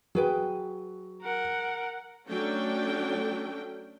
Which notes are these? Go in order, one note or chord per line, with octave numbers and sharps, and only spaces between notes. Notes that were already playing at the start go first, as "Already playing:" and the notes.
F#3 G#4 B4 G5
A#4 F#5
F#3 A3 C#4 D4 A4 G5